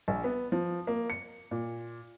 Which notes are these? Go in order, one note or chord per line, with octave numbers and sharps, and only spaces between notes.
A#1
B3
F3
A#3
C#7
A#2